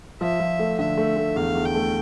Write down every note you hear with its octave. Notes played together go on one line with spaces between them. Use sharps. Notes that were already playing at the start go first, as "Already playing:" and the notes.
F3 E5
F3
A3
D3 E5
A3
A3
E2 F5
E2
G5
A3